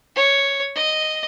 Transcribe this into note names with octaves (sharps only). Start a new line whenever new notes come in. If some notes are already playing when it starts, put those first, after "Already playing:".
C#5
D#5